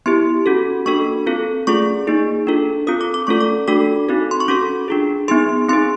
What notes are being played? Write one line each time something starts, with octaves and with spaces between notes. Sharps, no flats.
B3 E4 G4 C6
C#4 F#4 A4
A#3 D4 F#4 A4 C#6
C4 F4 A4
A3 C#4 F4 G#4 C#6
A#3 D#4 G#4
D4 F4 A4
C4 F4 A4 D#6
D6
D6
A3 C#4 F4 A4 C#6
D6
A3 D4 F#4 A4 D6
C4 D#4 F#4 A4
C6
C#6
C#4 F#4 A4 D6
D4 F4 G#4
B3 D#4 G#4 C6
C4 D#4 G#4 C6